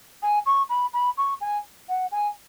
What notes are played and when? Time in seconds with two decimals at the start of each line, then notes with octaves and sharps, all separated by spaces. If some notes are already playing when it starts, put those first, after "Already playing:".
0.23 G#5
0.46 C#6
0.69 B5
0.93 B5
1.18 C#6
1.41 G#5
1.89 F#5
2.12 G#5